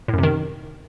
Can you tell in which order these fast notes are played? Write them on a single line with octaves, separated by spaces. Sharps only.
A2 F#2 C3 D#3